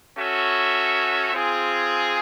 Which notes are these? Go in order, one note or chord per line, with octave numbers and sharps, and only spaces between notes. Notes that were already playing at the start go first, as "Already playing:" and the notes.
C#4 F#4 A4 C#5 E5
C4 F4 G#4